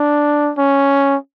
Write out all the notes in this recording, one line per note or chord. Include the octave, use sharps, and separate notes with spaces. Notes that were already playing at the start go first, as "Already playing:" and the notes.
Already playing: D4
C#4